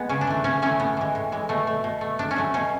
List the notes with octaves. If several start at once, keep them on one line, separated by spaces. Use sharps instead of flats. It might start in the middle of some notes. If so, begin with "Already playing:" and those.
Already playing: G#3 B3
C#3 C#4
D4
E3 A3
C#3 C#4
E3 A3 C#4
A2 B3
E3 G#3
A2
E3 G#3
B2 A3
A3
B2
A3
B2 D4
C#4
F#3 A3
B2 C#4